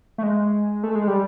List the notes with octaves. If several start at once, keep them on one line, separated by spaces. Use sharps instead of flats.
A3
G#3
A3
G#3
G3